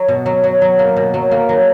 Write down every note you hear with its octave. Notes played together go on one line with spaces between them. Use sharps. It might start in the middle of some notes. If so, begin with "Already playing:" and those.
Already playing: F#3
B2
F#3
F#3
F#3
A#3
B2
F#3
A#3
F#3